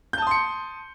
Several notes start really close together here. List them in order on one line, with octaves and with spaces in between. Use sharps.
G6 A5 D#6 C6 C#7